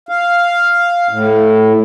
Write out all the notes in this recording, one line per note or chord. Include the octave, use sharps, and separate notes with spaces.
F5
A2